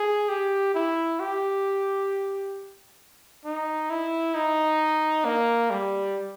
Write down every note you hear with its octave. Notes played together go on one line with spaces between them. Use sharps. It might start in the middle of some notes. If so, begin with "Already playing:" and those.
Already playing: G#4
G4
E4
G4
D#4
E4
D#4
A#3
G3